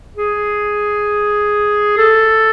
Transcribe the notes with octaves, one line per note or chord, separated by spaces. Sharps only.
G#4
A4